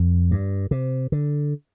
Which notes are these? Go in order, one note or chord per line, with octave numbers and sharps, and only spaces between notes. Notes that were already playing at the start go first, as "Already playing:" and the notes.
Already playing: F2
G2
C3
D3